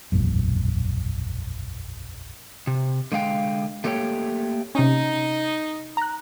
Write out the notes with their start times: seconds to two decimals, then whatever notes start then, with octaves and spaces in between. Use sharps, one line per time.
0.12 E1 A#1 F#2
2.67 C3
3.12 D3 G#3 F5 G5
3.84 A3 A#3 G4 A4 C#5 G5
4.75 C3 C#4 D#4
5.97 A#5 F#6